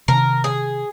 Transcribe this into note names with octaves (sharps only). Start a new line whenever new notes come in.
C3 D#3 A#4
G#4